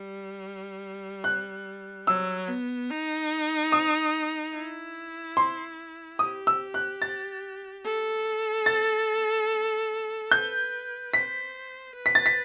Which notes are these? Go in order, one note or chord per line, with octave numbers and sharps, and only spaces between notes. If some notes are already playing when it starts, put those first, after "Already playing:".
Already playing: G3
F#6
F#3 E6
B3
D#4
D#6
E4
C6
G4 D#6
E6
F#6
A6
A4
A6
B4 G6
C5 B6
B4
B6
A6
B6